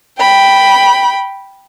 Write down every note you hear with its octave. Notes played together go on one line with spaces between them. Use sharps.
G5 B5